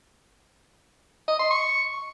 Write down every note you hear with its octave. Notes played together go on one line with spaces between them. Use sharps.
D#5
C6
C#6